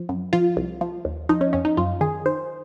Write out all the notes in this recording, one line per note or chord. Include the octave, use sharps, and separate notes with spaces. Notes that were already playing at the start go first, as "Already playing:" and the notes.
Already playing: F3
F#2
F3 F4
C2
F3
D#2
F3 D#4
C#4
F2 C#4
D#4
F#2 F4
D#3 G#4
D#3 C5